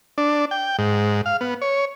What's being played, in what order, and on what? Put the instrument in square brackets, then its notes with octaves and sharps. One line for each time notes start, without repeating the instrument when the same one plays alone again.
[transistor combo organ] D4
G5
G#2
F5
B3
C#5